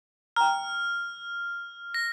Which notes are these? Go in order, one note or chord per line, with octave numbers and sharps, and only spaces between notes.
G5 A#5 F6
A#6